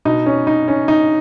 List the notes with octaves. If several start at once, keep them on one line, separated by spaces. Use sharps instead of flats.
B2 D#4
C#4
D#4
C#4
D#4